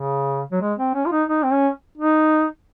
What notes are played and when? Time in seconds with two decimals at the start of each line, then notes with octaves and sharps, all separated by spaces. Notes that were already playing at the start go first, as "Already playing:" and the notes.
Already playing: C#3
0.52 F#3
0.62 G#3
0.79 C4
0.95 C#4
1.06 F4
1.12 D#4
1.29 D#4
1.43 C4
1.52 C#4
1.98 D#4